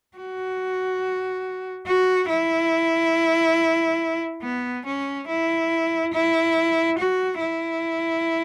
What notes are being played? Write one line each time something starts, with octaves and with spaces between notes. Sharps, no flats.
F#4
F#4
E4
B3
C#4
E4
E4
F#4
E4